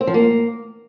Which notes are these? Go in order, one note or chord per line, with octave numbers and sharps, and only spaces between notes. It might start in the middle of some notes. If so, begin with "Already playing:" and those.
C4
F3
A#3